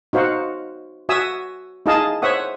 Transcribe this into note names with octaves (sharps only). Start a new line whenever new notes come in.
D#4 F#4 C5 F5 F#5
F#4 E5 G#5 D#6 E6
D#4 E4 G#4 D#5 F5 A5
C5 C#5 E5 F#5 D#6